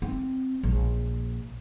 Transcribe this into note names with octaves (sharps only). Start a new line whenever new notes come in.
C4
A#1